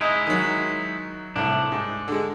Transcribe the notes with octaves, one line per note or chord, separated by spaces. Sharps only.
G#3 D#4 E4 D#5
D#3 F#3
C2 A2 D4
G#2
D3 G#3